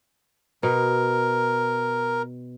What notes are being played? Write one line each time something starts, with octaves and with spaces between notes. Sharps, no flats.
B2 A#4